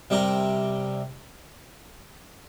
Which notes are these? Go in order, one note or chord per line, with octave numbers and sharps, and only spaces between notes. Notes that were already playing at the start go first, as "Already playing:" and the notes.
C3 G3 C4 G4 A#4